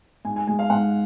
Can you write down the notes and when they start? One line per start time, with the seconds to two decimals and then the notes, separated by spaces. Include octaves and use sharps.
0.25 G#2 G#5
0.36 G#5
0.47 G#3 G#5
0.59 F5
0.70 G#2 F#5